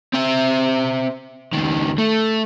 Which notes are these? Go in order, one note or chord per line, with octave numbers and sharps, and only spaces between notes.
C4 E5
C#2 D#3
A3